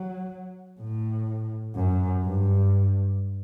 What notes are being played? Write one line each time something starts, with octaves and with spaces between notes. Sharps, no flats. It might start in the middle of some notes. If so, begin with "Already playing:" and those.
Already playing: F#3
A2
F#2
G2